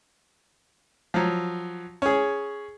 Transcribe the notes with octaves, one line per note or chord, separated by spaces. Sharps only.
F3 F#3
C#4 G#4